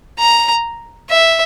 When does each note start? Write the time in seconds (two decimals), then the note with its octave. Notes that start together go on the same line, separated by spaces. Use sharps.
0.19 A#5
1.10 E5